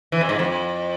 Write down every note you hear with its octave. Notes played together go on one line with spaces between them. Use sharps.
E3
F2
G#2
F2